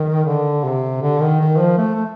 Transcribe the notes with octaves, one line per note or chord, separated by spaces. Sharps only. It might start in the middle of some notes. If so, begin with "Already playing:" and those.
Already playing: D#3
D3
C3
D3
D#3
D#3
F3
A3
A3